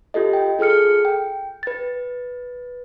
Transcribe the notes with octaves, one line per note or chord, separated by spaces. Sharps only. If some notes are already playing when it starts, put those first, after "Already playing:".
F4 G4 A4 D#5
G5
F4 G#4 A4 F6 C#7
G5
B4 A6